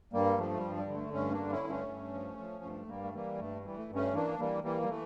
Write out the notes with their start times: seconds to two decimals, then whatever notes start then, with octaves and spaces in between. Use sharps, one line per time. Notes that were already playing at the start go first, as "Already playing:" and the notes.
0.13 G2 G3 A#3
0.38 F3 A3
0.57 G3
0.63 G2
0.76 G3
0.88 D3
0.94 A3
1.13 G2 A3 C#4
1.32 A#3 D4
1.38 D3
1.51 C#4 E4
1.63 G2
1.70 A3 C#4
1.88 G2
2.13 F3
2.39 F3
2.63 G2 A3
2.88 G2 G3 A#3
3.05 A3
3.13 E3 G3 A#3
3.39 G2 A3
3.64 E3 G3
3.77 A3
3.89 G2
3.95 A3 C#4
4.13 E3 A#3 D4
4.39 E3 G3 A#3
4.64 E3 G3 A#3
4.83 G3
4.89 E3 A3